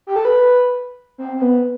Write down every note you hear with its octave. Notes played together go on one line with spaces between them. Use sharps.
G4
A4
B4
C4
C4
B3